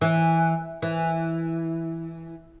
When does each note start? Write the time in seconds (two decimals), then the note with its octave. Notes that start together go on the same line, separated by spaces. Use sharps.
0.01 E3
0.82 E3